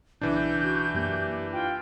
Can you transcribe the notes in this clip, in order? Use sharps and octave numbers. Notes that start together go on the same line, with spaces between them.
B1 C#3 E3 D4 G6
F#4
F#2 A#3 G4
F4 G5